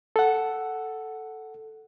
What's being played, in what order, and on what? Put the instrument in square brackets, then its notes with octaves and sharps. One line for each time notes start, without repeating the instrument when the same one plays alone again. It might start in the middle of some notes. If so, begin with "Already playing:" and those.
[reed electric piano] A4 F#5